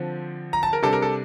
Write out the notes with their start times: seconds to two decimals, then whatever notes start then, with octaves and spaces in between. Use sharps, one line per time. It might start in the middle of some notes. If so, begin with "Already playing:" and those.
Already playing: D3 F3 C4
0.53 A#5
0.63 A5
0.73 A#4
0.83 C3 G3 D4 A4
0.93 A#4
1.02 A4